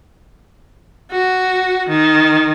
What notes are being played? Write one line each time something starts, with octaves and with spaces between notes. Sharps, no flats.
F#4
D#3